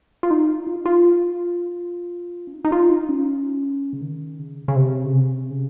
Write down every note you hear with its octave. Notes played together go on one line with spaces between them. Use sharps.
F4
D#4
F4
F4
C#4
D#4
D#4
F4
D#4
C#4
C#3
D#3
C#3
C#3
C3
C#3
C3
C#3